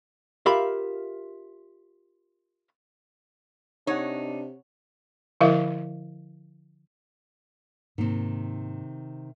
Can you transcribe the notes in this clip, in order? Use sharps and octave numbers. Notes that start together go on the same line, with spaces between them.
F4 G4 A#4 E5 F5 B5
C3 D4 D#4 C#5 F#5
D3 F3 E4 A#4 E5 F5
G#2 C3 D#3 A#3